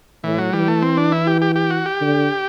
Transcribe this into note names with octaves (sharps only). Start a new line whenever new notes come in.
A2 E3
F#3
E3 G3
A3
C4
D4
E4
G4
G4
G4
F#4
G4
D3